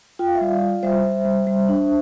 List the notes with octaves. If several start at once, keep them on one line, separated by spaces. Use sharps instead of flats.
F4 G5
F5
E5
G3 D5 F5
F4
G3 C5 E5
G3
G3
G3
D4